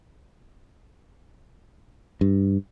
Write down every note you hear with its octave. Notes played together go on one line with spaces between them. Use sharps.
G2